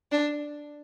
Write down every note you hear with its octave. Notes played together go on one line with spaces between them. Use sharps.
D4